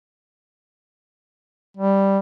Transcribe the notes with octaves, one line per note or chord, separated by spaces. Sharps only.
G3